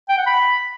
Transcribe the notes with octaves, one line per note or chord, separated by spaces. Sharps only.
G5
F#5
B5